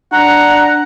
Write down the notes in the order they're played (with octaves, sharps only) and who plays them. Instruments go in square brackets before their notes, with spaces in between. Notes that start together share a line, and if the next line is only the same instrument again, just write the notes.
[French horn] D4 [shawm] F#5 [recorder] A#5